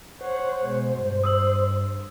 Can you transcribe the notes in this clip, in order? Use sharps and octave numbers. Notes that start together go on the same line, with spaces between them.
C5 C#5 F#5
B2 G#3
G2
D#6 E6 F#7